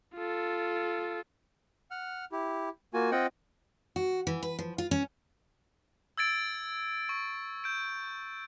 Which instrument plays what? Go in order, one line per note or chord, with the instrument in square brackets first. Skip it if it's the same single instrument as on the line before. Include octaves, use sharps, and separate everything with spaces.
[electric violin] F4 A4
[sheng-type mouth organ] F#5 F6
E4 G4
A#3 F4 F#4 G#5
C4 F4 D#5 F#5 G5
[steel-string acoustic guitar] F#4
E3
B4
F3
F4
C#4
[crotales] E6 G#6 A6 D7
C#6
G6 D7